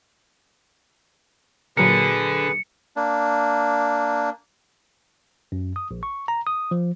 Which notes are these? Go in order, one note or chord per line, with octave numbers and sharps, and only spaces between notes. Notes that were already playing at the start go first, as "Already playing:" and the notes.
A#2 D3 F#3 G#4 A#4 B4 C#7
A#3 D4
F#2
D#6
A#1
C#6
A#5
D#6
F3